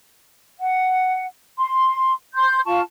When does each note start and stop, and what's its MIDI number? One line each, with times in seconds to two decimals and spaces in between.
0.58 1.24 78
1.58 2.14 84
2.34 2.61 84
2.34 2.61 91
2.66 2.81 65
2.66 2.81 77
2.66 2.81 81
2.66 2.81 85